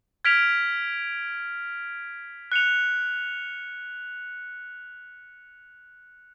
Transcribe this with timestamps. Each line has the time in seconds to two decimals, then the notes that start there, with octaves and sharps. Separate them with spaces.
0.25 F6 G#6 B6 D7 F7
2.52 F#6 C#7 F7